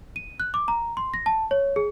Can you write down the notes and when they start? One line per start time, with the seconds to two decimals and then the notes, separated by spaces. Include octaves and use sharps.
0.16 D#7
0.40 F#6
0.54 D6
0.68 A#5
0.97 C6
1.14 A#6
1.26 A5
1.51 C#5
1.76 G#4